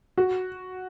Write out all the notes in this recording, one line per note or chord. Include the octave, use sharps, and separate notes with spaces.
F#4